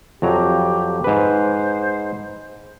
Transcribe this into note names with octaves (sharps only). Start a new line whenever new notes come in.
F2 F#3 G4 A#5
G#2 B4 C5